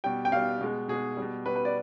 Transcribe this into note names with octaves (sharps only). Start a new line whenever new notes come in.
B2 G3 G5
G5
B2 G3 F5
B2 G#3
B2 G#3 G#4
G3
B2
B2 G3 B4
B4
D5